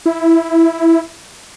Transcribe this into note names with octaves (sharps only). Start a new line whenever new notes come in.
E4